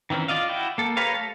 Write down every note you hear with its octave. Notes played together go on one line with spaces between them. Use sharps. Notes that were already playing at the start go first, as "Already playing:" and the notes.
D#3 E3 C4 C#4
F4 D5 D#5 F5
E4 F#4 G5
A#3 A4
G4 A#4 B4 C#5 F5
A3 A4